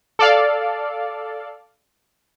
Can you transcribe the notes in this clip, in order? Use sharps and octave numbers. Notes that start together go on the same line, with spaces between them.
A4 D5 F5